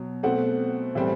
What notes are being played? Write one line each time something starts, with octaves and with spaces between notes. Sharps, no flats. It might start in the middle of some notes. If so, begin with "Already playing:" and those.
Already playing: B2 F#3
B2 A3 C4 F#5
A2 E3 G3 C4